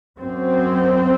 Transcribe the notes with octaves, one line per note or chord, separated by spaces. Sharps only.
F#2 C4